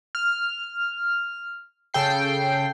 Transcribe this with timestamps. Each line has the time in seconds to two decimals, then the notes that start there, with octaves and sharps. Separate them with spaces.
0.15 F6
1.94 C#3 A4 G5 C7